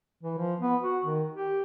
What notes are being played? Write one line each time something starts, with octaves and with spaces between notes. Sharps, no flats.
E3
F3
B3
F#4
D#3
G4